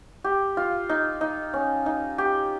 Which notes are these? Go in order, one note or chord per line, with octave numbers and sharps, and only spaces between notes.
G4
F4
D#4
D#4
C#4
D#4
G4